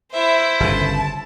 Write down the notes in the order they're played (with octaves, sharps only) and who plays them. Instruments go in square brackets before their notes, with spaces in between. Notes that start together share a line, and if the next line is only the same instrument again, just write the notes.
[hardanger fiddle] E4 C5 [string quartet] E5
[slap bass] G1 C#3 [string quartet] A5